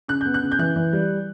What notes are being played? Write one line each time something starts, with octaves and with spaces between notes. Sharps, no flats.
C#3 F#6
B3 G6
F#6
C#3
G6
E3 F#6
E3
G3